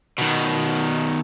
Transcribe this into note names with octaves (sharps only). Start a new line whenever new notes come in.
B2 D#3